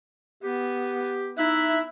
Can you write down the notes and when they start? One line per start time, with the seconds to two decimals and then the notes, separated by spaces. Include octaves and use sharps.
0.43 B3 G4
1.38 D#4 E4 E5 F#6